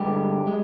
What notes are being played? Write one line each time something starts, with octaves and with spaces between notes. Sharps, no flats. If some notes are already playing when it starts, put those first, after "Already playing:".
Already playing: G2 D3 G#3 G4
G#3